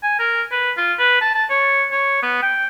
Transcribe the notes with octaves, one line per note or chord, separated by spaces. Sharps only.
G#5
A#4
B4
F4
B4
A5
A5
C#5
C#5
B3
G5